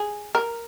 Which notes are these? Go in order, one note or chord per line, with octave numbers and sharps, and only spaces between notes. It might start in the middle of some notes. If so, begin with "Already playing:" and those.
Already playing: G#4
A#4